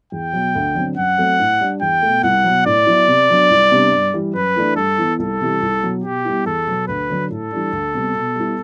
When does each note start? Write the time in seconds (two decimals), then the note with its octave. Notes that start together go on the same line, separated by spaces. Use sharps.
0.12 E2 G5
0.33 B2 F#3
0.55 D2
0.75 D3 F#3 C4
0.97 F#2 F#5
1.18 F#3 A3 C4
1.40 A2
1.61 G3 D4
1.81 E2 G5
2.02 B2 A3
2.23 C2 F#5
2.44 B2 F#3
2.66 A2 D5
2.87 F#3 B3 E4
3.08 C3
3.29 F#3 B3 D4
3.50 C2
3.71 C3 G3 B3 D4
3.92 G2
4.14 E3 G3
4.34 F#2 B4
4.56 E3 A3 D4
4.76 G2 A4
4.98 E3 B3
5.19 C2 A4
5.41 C3 E3 G3
5.62 C2
5.82 B2 F#3
6.04 B2 G4
6.25 G3 B3 E4
6.46 E2 A4
6.67 B2 F#3 B3
6.88 D2 B4
7.09 D3 F#3
7.30 A2 A4
7.52 E3 G3 D4
7.72 D2
7.94 C3 G3 B3
8.15 B2
8.36 G3 B3 E4